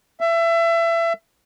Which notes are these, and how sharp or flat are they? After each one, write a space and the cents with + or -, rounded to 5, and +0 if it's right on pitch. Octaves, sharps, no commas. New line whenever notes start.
E5 +25